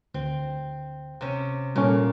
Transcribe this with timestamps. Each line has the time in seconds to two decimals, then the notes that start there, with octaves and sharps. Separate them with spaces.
0.14 D2 C4
1.21 C3 C#4
1.76 A#2 G3 C#4 A4